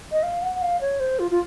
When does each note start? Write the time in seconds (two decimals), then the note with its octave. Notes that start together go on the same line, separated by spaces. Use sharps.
0.12 D#5
0.23 F5
0.42 F#5
0.55 F#5
0.62 F5
0.81 C#5
1.00 C5
1.19 F4
1.31 F4